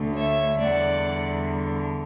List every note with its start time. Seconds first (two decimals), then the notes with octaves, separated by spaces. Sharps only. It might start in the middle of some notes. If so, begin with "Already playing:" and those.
Already playing: D2 D3 A3
0.14 C#5 E5
0.59 E2 D3 G3 D5 F#5